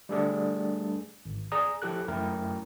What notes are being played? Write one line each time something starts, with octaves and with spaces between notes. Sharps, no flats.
G3 A3 D4 G#4 A4 D5
G#1
G#4 D5 A#5 D#6
F3 E4 G4 A4 F#6
F#2 A3 E4 A#4 G5 A#5